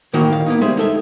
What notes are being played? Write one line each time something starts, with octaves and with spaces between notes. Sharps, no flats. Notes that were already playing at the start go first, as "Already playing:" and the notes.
A2 D#3 A#3 D#4 F#4
F5
A#3 B3 D#4
G3 G#3 C5 E5
D#4 A4 E5